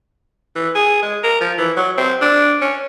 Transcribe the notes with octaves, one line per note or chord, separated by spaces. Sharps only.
E3
G#4
G#3
A#4
F3
E3
F#3
C4
D4
C#4